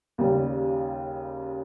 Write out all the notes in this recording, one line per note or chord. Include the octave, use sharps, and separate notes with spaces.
D#2 C#3 G3